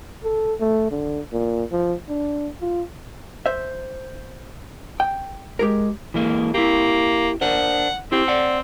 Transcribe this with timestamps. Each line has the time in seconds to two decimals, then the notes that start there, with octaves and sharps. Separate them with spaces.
0.24 A4
0.60 A3
0.91 D3
1.33 A#2
1.72 F3
2.09 D4
2.61 F4
3.46 C5 E5
5.00 G5
5.59 G#3 G4 G#4 A#4
6.14 E3 G#3 A#3
6.54 A#3 E4 G4
7.41 D4 A#4 C5 F#5
8.12 C4 E4 G4
8.28 D5 F#5